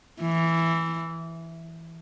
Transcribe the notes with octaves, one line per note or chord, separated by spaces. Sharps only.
E3